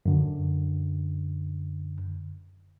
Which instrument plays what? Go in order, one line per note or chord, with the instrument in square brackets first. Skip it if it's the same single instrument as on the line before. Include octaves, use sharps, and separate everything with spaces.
[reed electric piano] F#2 D3